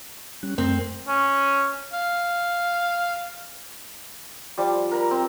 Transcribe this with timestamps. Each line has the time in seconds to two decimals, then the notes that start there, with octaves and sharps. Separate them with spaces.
0.43 G3 C#4 F#6
0.58 F#2 A3 C4 A#4
1.08 C#4
1.93 F5
4.58 F3 G3 D6
4.92 A#4 A#5 B5
5.11 C4